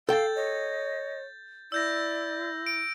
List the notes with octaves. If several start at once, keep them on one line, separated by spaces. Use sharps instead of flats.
A4 F5 G5 G6 A6
C#5 D#5
E4 D5 E6 G6 A#6
D7